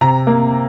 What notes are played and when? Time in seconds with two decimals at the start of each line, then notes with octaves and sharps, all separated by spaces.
0.01 C3 A#5
0.27 A#3